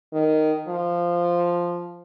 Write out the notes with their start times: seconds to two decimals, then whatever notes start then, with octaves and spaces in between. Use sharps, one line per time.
0.13 D#3
0.68 F3